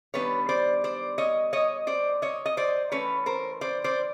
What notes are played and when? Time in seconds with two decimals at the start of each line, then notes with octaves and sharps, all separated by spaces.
0.14 D#3 G3 B3 D4 B4 C#5
0.49 C5 D5
0.84 C5 D5
1.18 C#5 D#5
1.53 C#5 D#5
1.87 C5 D5
2.22 C#5 D#5
2.46 D#5
2.57 C5 D5
2.92 E3 A3 C#4 B4 C#5
3.26 A#4 C5
3.61 C5 D5
3.84 C5 D5